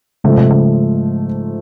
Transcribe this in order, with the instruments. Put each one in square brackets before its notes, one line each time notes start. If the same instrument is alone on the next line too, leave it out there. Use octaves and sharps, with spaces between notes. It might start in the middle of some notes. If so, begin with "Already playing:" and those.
[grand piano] G#2 F3 A3 [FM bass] C#3
[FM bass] C3
C#3